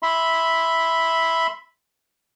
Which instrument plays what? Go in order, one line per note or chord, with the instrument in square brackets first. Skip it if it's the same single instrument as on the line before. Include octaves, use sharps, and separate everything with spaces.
[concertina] E5 B5 C6